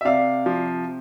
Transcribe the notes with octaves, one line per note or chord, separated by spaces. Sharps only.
E5
C3 D5 F5
F3